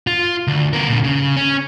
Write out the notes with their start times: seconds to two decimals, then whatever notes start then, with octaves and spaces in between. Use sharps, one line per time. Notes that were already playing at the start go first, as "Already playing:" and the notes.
0.07 F4
0.47 D2
0.73 B3 A#4
0.88 A#2 D3
1.04 C#3
1.37 C#4